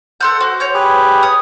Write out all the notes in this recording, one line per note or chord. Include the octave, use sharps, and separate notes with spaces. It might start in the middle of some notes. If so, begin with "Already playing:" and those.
A4 F#5 C6 G6
F#4 C5
C#5 G6
G4 G#4 B4
C#5 D#6